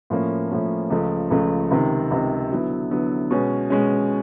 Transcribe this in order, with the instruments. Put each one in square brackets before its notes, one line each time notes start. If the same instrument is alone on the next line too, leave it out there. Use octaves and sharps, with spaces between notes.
[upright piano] A2 F3 A#3 C#4
A2 F3 A#3 C#4
C#2 C#3 F3 A3
C#2 C#3 F3 A3
C#2 C3 D#3
C#2 C3 D#3
D3 F#3 B3 E4
D3 F#3 B3 E4
B2 G#3 C#4
B2 G#3 C#4